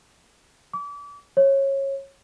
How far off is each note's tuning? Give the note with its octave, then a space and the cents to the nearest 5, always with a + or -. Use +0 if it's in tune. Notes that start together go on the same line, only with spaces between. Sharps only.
D6 -35
C#5 -20